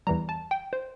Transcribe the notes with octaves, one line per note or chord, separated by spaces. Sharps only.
E2 E3 G3 A#5
A5
G5
C5